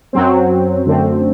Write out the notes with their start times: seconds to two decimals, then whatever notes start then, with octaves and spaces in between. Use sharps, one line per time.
0.13 F#2 F#3 C4
0.85 F#2 D3 A3 C4